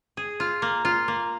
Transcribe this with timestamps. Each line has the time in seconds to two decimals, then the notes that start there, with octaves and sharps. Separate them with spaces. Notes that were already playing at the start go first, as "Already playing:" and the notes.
0.17 G#4
0.40 F4
0.62 A#3
0.85 F4
1.08 A#3